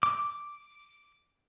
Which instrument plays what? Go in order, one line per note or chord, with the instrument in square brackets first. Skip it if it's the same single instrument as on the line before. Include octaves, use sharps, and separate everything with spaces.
[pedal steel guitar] D6